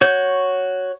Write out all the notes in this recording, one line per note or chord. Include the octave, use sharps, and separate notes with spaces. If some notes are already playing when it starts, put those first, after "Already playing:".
F#4 C#5 G6